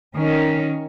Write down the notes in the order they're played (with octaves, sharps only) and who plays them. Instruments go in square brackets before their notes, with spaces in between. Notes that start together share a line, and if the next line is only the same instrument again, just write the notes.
[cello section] D#3 C#4